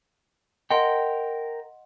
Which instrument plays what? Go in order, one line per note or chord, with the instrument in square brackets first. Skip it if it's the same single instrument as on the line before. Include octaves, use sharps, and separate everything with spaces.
[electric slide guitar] A#4 G5 [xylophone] D#5 F#5 C6